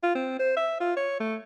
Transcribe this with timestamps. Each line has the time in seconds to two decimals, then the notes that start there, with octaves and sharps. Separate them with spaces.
0.03 F4
0.15 C4
0.39 C5
0.57 E5
0.80 F4
0.97 C#5
1.20 A3